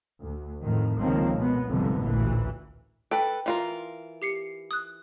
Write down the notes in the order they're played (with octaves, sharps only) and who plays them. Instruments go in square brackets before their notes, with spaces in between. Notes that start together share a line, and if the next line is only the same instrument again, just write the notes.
[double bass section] D2
F2 A2 D#3
F1 C#2 D#3 F3 A#3 C4
B2 G#3 B3
F1 C2 G#2 D3 F3 B3
A1 D2 A#2 E3
[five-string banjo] A4 B4 [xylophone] G5
[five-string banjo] E3 F4 A#4
[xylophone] G4 C7 C#7
D#6 F#6